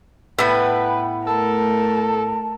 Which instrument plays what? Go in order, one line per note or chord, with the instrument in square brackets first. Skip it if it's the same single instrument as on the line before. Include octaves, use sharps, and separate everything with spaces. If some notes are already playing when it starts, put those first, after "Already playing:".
[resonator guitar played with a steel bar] A2 B3 [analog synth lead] B4 [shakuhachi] G5
[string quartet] A3 A#4 [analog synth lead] A4 [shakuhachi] A5